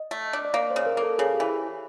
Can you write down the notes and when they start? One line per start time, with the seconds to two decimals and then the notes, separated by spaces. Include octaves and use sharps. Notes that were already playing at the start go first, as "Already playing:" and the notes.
Already playing: D#5
0.11 A3
0.33 D4
0.45 D5
0.54 A#3 C#5
0.70 C5
0.76 C#3
0.86 A#4
0.97 A#3
1.02 A4
1.19 C#3 G#4
1.34 G4
1.40 E3